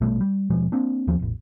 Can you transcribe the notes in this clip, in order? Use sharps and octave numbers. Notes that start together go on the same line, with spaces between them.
A#1 B2 G3 A3
G3
D#1 B2 F3 G#3
A#3 C4 D4
D#2 F3 C#4
E1 A1